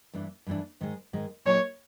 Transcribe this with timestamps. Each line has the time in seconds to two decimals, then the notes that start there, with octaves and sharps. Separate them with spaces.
0.13 G2 E3 A3 D4
0.47 G2 E3 A3 D4
0.81 G#2 D#3 G#3
1.13 G#2 D#3 G#3
1.45 A#2 F#3 A#3 D#4 C#5